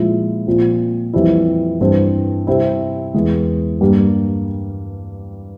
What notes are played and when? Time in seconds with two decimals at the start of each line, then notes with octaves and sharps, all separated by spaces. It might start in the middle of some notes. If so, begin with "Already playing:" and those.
Already playing: A#2 F3 G#3 E4
0.47 A#2 F3 C4
1.14 F2 E3 G3 C4 E4
1.81 G2 E3 G3 C4 E4
2.47 C3 G3 C4 E4
3.14 E2 E3 G#3
3.81 G2 G3 A#3